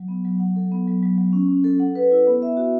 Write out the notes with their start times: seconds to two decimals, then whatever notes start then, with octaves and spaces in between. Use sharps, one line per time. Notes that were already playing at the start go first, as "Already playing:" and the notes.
Already playing: F#3
0.08 B3
0.25 F#3
0.40 F#5
0.56 A4
0.72 B3
0.87 F#3
1.03 F#3
1.18 F#3
1.33 C#4
1.48 C#4
1.64 A4
1.80 F#5
1.95 B4
2.11 E4
2.27 B3
2.42 E5
2.57 F#4